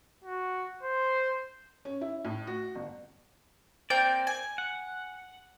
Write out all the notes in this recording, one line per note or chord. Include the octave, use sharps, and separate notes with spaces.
F#4
C5
C#4
E4
A2
F#4
G1
A#3 C4 D5 G6
G#5
F#5